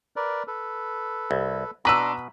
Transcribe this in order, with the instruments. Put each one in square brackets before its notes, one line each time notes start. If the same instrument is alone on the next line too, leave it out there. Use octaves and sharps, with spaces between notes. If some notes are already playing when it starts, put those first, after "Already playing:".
[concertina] A#4 B4 D5
A4 B4
[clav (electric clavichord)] C2
[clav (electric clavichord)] B2 B4 [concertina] D4 C6 D6 [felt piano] A#5 E6